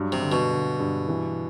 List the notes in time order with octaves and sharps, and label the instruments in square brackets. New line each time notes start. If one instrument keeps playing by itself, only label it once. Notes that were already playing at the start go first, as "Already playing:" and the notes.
Already playing: [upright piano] G2 F#3
[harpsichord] C3
[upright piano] D3
[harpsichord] B2
[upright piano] D3
G2
E3